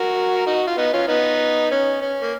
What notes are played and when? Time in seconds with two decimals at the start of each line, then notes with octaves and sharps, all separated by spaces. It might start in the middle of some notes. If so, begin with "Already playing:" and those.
Already playing: F#4 A#4
0.46 D#4 F#4
0.67 F4
0.77 B3 D#4
0.93 C#4 F4
1.08 B3 D#4
1.71 C#4
2.01 C#4
2.22 A#3